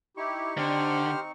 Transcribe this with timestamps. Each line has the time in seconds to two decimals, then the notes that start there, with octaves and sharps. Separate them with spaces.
0.17 D#4 E4 G4 C#6
0.57 D3 C4 G4 C5 F6